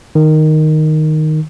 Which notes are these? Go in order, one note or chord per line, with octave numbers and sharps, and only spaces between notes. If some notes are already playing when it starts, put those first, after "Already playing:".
D#3